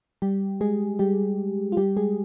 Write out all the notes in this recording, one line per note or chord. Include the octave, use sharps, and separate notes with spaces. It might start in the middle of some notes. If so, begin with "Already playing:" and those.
G3 G4
G#3 G#4
G3 G4
F4
G3 G4
G#3 G#4